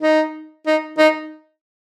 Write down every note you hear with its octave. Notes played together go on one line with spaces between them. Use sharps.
D#4
D#4
D#4